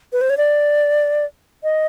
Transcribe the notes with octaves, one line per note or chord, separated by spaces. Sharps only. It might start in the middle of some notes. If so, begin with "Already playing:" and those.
B4
C5
C#5
D5
D#5